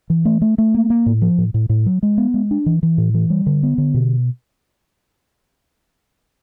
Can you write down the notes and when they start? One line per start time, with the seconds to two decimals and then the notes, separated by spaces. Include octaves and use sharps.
0.10 E3
0.25 A3
0.42 A3
0.58 A3
0.74 A#3
0.90 A#3
1.06 A2
1.22 F3
1.38 A2
1.54 A2
1.69 A2
1.86 F#3
2.03 G#3
2.18 B3
2.34 G#3
2.51 D4
2.66 E3
2.83 E3
2.98 A2
3.14 E3
3.30 G3
3.46 D3
3.63 B3
3.78 D3
3.94 B2